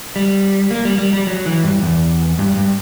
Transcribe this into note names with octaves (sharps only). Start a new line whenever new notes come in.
G3
A#3
G3
G3
G3
F#3
E3
G2
E2
G2
G2